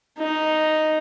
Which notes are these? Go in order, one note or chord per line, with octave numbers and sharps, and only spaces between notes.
D#4